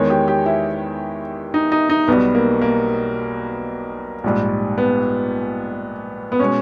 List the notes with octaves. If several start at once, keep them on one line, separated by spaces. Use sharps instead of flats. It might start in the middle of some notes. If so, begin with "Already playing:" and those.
Already playing: E2 D#3 G#3 C#5
G4
G4
E4
D#4
D#4
D#4
B1 B2 G3 B3
A#3
A#3
A#1 G#2 G3
B3
B3
B2 G#3 C#4